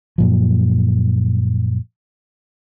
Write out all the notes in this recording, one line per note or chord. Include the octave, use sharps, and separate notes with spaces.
F#2 A#2 F3